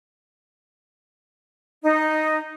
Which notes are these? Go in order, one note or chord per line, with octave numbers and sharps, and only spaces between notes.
D#4